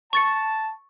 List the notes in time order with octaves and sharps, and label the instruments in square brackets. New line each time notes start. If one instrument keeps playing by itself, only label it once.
[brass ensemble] A5 [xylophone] C#6 A6 C#7